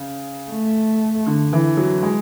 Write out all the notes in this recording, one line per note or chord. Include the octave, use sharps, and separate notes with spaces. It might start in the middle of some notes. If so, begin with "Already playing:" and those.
Already playing: C#3
A3
D3
E3
F#3
G#3